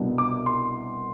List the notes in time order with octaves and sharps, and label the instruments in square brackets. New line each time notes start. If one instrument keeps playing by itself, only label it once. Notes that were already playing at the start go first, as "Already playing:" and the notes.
Already playing: [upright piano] C2 B2 B3 D4
D6
C6